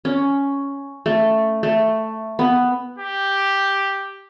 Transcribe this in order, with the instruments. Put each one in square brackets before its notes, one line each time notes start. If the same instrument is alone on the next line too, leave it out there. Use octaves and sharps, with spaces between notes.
[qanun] C#4
A3
A3
B3
[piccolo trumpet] G4